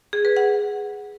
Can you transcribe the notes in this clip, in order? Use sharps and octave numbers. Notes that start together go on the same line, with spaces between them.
G#4
B4
F#5